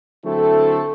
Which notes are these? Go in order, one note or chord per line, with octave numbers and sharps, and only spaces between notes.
D3 F#3 A3 C4 E4 A4